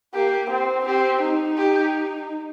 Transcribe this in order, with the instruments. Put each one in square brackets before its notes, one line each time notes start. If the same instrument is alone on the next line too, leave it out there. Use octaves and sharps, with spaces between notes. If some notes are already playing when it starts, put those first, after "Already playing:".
[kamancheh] A#3 [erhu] G4
[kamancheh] C4
[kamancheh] C4 [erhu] G4
[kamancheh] D#4
[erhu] G4